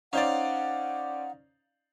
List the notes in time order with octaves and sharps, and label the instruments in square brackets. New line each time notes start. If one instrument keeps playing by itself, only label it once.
[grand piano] C#4 C5 D5 [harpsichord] D#4 F5 [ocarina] F#5